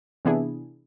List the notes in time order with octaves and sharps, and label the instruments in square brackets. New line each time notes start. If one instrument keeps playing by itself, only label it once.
[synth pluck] C3 E3 B3 D4 E4 G#4